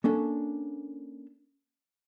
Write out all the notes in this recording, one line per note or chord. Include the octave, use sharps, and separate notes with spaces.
A#3 C#4 D4 A4